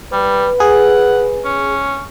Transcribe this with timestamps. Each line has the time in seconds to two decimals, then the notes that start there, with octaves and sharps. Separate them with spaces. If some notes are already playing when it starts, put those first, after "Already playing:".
0.13 G3 B4
0.60 G#4 F#5
1.45 C#4